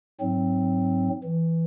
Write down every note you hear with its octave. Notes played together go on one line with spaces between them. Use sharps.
G#2 F#3 C4
E3